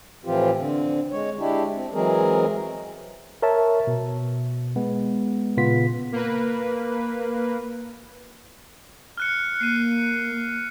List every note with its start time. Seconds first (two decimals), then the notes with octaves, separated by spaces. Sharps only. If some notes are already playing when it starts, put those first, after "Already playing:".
0.25 A2 E3 F3 C4 F4 G4
0.57 D3 C4
1.12 G#3 C#5
1.39 G#3 D4 E4 G4
1.74 C4
1.93 E3 F#3 G#3 C4 G#4 A#4
3.42 A#4 C#5 E5 A5
3.87 B2
4.76 G#3 B3
5.57 A#2 C#3 B3 F4 B6
6.12 A#3 B4
9.17 F6 F#6 C#7
9.60 A#3 C7 C#7 D#7